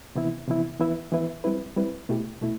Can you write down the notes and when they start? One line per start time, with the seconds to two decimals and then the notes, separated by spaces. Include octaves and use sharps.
0.15 C3 E3 B3 E4
0.47 C3 E3 B3 E4
0.80 E3 B3 E4 B4 E5
1.12 E3 B3 E4 B4 E5
1.44 G3 C4 E4 B4
1.76 G3 C4 E4 B4
2.09 B2 A3 E4 G4
2.41 B2 A3 E4